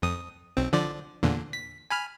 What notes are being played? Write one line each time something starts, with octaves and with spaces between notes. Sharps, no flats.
F2 D#6
B1 C4
D3 F3 D5
E2 A#2 D3
B6
G#5 B5 F6